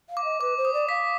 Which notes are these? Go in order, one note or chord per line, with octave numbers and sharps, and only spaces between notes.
F5
D6
D#5
B4 D6
C5
D#6
D5
F5 B6